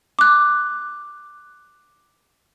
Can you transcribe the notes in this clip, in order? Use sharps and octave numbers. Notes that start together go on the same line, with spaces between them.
D6 F#6